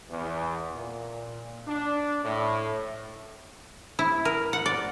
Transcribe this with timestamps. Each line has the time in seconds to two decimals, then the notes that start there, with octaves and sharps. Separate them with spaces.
0.10 E2
0.76 A#2
1.68 D4
2.24 A2
3.99 E4
4.25 A#4
4.53 F#5
4.66 D5